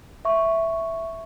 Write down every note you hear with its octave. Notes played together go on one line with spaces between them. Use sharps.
E5 C#6